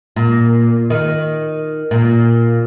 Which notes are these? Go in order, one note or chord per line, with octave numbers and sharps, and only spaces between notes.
A#2
D#3
A#2